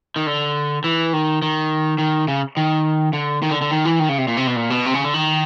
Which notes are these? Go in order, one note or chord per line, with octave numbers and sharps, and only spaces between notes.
D#3
D3
E3
D#3
D#3
D#3
C#3
D#3
D3
D#3
D3
D3
D#3
E3
D#3
C#3
C3
A#2
C3
B2
A#2
B2
C3
C#3
D3
D#3